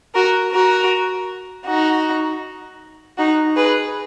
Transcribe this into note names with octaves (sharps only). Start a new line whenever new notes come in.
F#4 A#4
F#4 A#4
D#4 F#4
D#4 F#4
G#4 B4